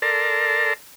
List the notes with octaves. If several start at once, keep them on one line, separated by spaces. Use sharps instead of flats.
A4 A#4 D5 A5 A#5 C6